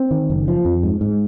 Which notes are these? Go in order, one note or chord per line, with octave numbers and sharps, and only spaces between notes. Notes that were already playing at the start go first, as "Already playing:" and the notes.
Already playing: C4
D#3
F#1
F3
F2
G#2
G#2